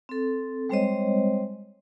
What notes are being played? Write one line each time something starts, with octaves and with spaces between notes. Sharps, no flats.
C4 A4
G3 G#3 C4 C5 C#5 D#5